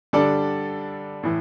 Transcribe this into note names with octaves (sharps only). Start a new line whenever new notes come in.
D3 G3 D4 A4 D5
A2 E3